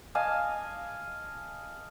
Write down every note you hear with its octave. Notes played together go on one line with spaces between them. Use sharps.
D#5 F5 G#5 A5